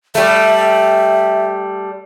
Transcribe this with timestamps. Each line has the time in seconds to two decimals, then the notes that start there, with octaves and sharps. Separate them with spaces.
0.15 G3 A3 E5